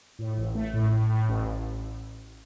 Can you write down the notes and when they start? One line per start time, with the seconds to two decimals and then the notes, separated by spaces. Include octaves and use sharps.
0.19 A2
0.37 A1
0.55 A3
0.73 A2
0.92 A2
1.10 A2
1.28 A1